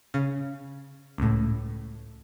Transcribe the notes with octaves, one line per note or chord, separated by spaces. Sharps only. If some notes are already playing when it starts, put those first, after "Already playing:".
C#3
C#2 A2